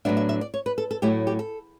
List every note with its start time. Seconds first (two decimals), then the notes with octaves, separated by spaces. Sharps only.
0.05 A2 F#3 B3 D4 E5
0.17 E5
0.29 E5
0.41 D5
0.54 C#5
0.66 B4
0.78 A4
0.91 A4
1.02 A2 F#3 A3 E4 G4
1.27 G4
1.39 A4